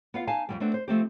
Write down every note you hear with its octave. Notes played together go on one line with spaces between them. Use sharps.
B3 F4 F5
D#4 F5 G#5 A5
F2 C#3 G3
A3 B3 C4 D4
C5
F3 A3 C4 G4